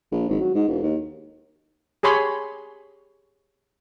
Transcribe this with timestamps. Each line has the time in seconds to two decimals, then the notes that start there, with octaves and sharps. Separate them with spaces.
0.11 A#1
0.29 G#1
0.40 F#3
0.54 G#2
0.68 E1
0.82 D#2
2.03 G4 G#4 C#5 B5 C6